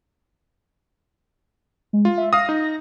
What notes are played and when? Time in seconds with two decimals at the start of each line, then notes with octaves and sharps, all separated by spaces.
1.93 G#3
2.05 F4
2.18 E5
2.33 F5 D#6 A#6
2.49 D#4